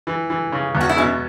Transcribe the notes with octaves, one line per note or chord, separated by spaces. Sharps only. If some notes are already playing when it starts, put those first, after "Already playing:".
E3
E3
C#3
E2
F#4
E4
B2 C#4